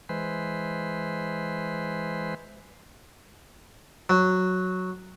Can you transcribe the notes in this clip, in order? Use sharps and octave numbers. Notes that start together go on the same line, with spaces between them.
E3 G#3 B4 C5
F#3